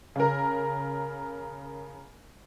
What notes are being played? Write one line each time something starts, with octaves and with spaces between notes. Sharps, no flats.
C#3 A#4